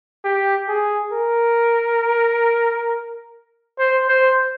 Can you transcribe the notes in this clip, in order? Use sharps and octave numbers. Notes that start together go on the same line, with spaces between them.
G4
G#4
A#4
C5
C5